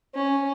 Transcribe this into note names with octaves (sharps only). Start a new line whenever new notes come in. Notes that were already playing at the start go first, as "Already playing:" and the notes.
C#4